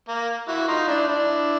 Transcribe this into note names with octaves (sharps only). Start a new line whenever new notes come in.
A#3
E4 F#4
D#4 F4
D4 E4
D4 E4